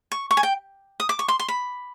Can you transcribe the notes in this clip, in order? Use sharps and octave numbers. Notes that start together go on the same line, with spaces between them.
C#6
C#6
G#5
G5
D#6
D6
C#6
C6
C6
B5